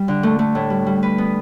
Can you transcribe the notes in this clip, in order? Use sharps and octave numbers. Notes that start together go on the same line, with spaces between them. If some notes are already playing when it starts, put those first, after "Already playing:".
Already playing: G3
D3
A3
A3
A2
G3
G3
B4
B3